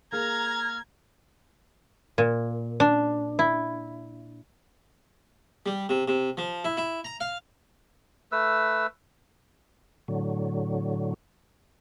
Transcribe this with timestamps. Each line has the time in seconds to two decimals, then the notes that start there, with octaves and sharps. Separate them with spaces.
0.12 A#3 G#4 A#5 F6 G#6
2.18 A#2
2.80 D4
3.39 E4
5.66 G3
5.89 C3
6.08 C3
6.37 F3
6.64 E4
6.77 E4
7.04 A#5
7.21 F5
8.32 A3 B4 E6
10.08 A2 D3 F#3